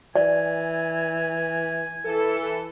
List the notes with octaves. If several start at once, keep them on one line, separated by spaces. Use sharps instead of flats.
E3 D5 G#5
E3 A4